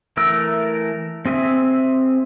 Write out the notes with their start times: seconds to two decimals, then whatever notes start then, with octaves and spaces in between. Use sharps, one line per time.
0.17 E3 A3 A#4 E6
1.26 C4 G#4 E5